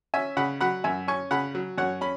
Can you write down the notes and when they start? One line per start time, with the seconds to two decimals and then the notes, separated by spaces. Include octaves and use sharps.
0.14 C#4 E5 G#5
0.37 C#3 F#5 B5
0.61 F#3 F#5 B5
0.84 F#2 E5 G#5
1.08 C#4 G#5 C#6
1.31 C#3 F#5 B5
1.55 F#3
1.78 F#2 C#5 F#5
2.01 C#4 B5